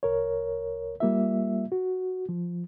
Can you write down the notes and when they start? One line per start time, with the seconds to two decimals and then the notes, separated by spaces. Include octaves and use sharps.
0.03 C2 A#4 C#5
1.00 G3 A#3 F4 E5
1.72 F#4
2.29 F3